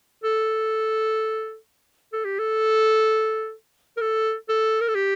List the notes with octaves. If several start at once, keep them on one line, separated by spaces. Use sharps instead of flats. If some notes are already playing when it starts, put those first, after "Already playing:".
A4
A4
G4
A4
A#4
A4
A4
A#4
A4
G4